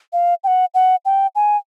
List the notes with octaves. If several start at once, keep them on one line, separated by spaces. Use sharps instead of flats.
F5
G5
F#5
F#5
G5
G#5